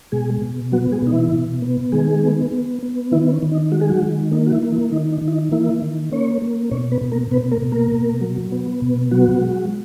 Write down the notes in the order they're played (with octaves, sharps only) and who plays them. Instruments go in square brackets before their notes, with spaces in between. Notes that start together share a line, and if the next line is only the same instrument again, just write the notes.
[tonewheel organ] B2 G#3 G#4
B2
F#3 B3 F#4
G#3 G#4
B2 D#4
E3 E4
B2
B3
D#3 G#3 G#4
B3
B3
B3
D#3 E3 E4
C#4
D#3
D#4
G#3 F#4
G#4
F#3 F#4
D#3
A#3 D#4
F#4
E3 E4
A#3
E3 E4
D#3 D#4
D#4
D#3
E4
D#4
E3 A#3 E4
D#3
A#3 C#4 C#5
A#3
B2 C#4 C#5
B3 B4
B2
A#3 A#4
B2 B3 B4
A#3 A#4
B2
A#3 A#4
B2
F#3
B3
B2
F#3 B3 F#4
G#3